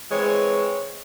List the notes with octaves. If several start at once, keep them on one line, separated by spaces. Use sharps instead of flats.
E3 G#3 C4 C#5